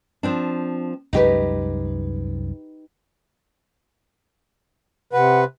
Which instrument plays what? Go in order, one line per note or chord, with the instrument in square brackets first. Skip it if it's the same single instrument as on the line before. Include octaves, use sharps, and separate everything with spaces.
[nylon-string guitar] F3 C4 D4
[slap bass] C2 F#2 G#3 [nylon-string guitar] D#4 G4 B4
[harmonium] C3 B4 [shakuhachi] F#5